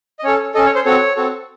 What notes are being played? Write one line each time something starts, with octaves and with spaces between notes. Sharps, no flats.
D#5
C#4 A4 C#5
C#4 A4 D#5
C#5
C5
C4 F#4 A4 C#5
C4 F#4 A4